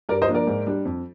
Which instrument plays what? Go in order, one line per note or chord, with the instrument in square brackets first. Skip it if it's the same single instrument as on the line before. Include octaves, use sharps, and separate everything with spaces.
[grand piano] G2 A#4 D5
C5 D#5
F3 A#3 D4
A#4 D5
G#2
G3 D4
F2